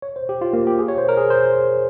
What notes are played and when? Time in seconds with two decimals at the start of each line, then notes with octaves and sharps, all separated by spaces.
0.02 C#5
0.16 C5
0.29 G4
0.41 F4
0.53 A#3
0.67 G4
0.79 G#4
0.88 C#5
0.98 C5
1.09 A#4
1.17 G#4
1.30 C5